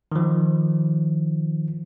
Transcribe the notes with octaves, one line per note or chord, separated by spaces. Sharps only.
D#3 F3